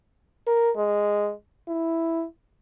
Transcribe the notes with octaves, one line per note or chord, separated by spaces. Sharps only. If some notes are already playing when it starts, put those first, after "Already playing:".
A#4
G#3
E4